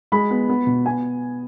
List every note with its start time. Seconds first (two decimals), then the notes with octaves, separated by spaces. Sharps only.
0.12 G#3 B5
0.31 B3
0.49 B3
0.67 B2
0.85 B3 G#5